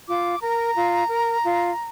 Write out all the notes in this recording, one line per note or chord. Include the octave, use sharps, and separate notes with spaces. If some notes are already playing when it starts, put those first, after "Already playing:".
F4 D6
A#4 A#5
F4
A#4
F4